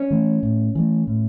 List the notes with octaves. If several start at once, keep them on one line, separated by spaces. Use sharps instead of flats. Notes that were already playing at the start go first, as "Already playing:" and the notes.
Already playing: C#4
E3 A3
A2
E3 A3
A2